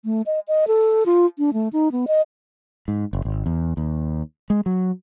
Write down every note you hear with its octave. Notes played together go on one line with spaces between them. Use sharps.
A3
D#5
D#5
A4
F4
D4
A3
D#4
B3
D#5
G#2
F#1
G#1
E2
D#2
G#3
F#3